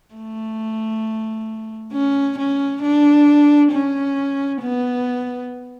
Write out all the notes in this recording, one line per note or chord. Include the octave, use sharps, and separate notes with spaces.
A3
C#4
C#4
D4
C#4
B3